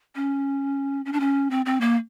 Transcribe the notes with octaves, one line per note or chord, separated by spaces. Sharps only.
C#4
C#4
D4
C#4
C4
C4
A#3